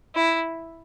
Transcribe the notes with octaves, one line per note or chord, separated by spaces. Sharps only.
E4